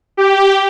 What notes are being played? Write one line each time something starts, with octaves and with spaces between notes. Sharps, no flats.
G4